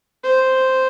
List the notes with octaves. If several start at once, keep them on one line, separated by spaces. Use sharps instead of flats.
C5